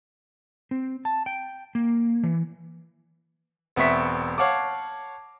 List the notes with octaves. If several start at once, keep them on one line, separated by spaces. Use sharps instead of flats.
C4
A5
G5
A#3
E3
E1 B3 C4 E5 C#6 B6
C#5 F5 F#5 A5 D6